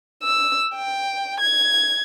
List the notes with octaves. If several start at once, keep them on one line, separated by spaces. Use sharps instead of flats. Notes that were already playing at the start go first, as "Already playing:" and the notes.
E6
G5
G#6